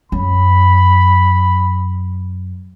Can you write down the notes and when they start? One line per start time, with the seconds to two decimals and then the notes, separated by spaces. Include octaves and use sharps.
0.12 F#2 B5